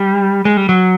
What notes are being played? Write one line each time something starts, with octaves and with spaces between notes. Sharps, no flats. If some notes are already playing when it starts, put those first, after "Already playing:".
Already playing: G3
G#3
G3
F#3